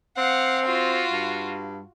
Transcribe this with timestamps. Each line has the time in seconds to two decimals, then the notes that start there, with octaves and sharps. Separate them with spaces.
0.17 C4 F5 F#5
0.66 F4 F#4
1.12 G2